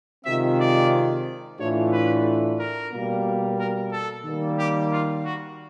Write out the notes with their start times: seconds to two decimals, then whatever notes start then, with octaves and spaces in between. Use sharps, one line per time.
0.25 C3 D#3 G#3 C4 F4 E5
0.58 D5
1.58 A2 E3 A3 D4 F4 C#5
1.92 B4
2.58 A#4
2.92 B2 G3 A#3
3.58 A#4
3.91 A4
4.25 D#3 G3 A#3
4.58 G4
4.91 F4
5.25 F#4